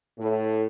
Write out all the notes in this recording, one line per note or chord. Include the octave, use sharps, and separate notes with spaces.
A2